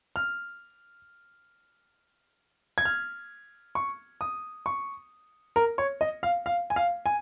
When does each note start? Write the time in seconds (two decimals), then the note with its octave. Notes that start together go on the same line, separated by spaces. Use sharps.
0.16 F6
2.78 G#6
2.85 F6
3.75 C#6
4.21 D#6
4.66 C#6
5.56 A#4
5.78 C#5
6.01 D#5
6.23 F5
6.46 F5
6.70 G#5
6.76 F5
7.06 G#5